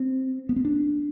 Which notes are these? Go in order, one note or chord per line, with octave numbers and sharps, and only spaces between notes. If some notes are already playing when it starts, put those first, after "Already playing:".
Already playing: C4
B3
C4
D4